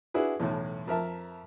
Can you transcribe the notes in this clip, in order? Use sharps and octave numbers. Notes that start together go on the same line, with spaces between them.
D4 E4 F#4 G#4 B4
B1 E2 A2
F2 A#4 E5 A5